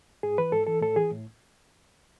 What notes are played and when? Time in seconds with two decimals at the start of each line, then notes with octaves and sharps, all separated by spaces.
0.23 G#2 G#4
0.38 E3 B4
0.52 G#2 A4
0.67 E3 A4
0.81 A2 A4
0.96 E3 G#4
1.11 A2